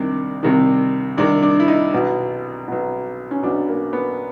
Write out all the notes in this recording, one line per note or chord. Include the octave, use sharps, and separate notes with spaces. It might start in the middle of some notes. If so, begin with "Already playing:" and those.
Already playing: C2 C3 D#3 D4
C2 C3 D#3
C2 C3 D#3 D4
D4
E4
D#4
B1 B2
B1 B2
C#4
B1 B2 D4
A#3
B3